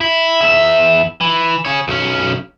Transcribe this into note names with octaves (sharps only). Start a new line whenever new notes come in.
E4
E2 E5
E3
G#4 C#5
B1 C#4